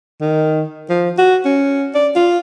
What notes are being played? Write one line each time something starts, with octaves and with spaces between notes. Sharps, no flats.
D#3
F3
F#4
C#4
D5
F4